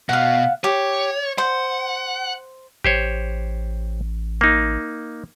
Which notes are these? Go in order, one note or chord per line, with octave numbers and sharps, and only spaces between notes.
B2 F5 F#5
G4 C#5
C5 F#5
A1 G4 C5 C#5
A#3 D#4